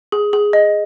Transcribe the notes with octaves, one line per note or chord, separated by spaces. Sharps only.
G#4
G#4
D#5